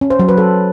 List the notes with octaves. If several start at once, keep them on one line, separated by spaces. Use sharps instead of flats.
C#4
C5
F#3
B4
A4